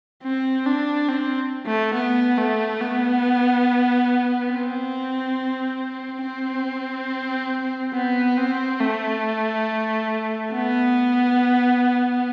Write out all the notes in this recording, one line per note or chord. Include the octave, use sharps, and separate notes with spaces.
C4
D4
C4
A3
B3
A3
B3
C4
C4
B3
C4
A3
B3